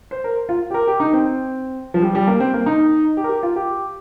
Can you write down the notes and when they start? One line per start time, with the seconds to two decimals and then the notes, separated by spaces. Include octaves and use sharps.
0.11 C5
0.24 A#4
0.49 F4
0.70 G4
0.74 A#4
0.87 G4
1.00 D#4
1.13 C4
1.94 F3
2.02 G3
2.15 G3
2.27 A#3
2.40 C4
2.54 A#3
2.66 D#4
3.17 G4
3.24 A#4
3.29 G4
3.43 F4
3.56 G4